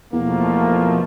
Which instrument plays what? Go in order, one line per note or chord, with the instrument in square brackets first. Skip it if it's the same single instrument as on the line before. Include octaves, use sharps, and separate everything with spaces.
[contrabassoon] E2 [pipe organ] B2 F3 A3 [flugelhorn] A#3